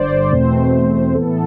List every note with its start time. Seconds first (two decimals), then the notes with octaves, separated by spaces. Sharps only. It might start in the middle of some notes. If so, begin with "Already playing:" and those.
Already playing: G1 G2 D3 C5 D5
0.31 E2 B2 A3 C4 C5
1.14 A2 E3 B3 A4